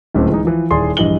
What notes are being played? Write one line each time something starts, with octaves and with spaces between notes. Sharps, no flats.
D1 C#2 A3 C4
E3 G#3 D#4
E3 F3
D#1 E4 G#4 D5 C6
A#1 G2 E3 D#5 F#7 G7